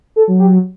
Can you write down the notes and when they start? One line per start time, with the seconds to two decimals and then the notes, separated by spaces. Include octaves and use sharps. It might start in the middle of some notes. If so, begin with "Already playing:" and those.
0.16 A4
0.28 F#3
0.39 G4